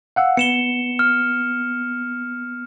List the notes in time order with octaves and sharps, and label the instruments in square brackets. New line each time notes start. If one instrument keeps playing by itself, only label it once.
[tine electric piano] F5 F#5 E6
[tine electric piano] B3 [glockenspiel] C#7 E7 G7
[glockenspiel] F6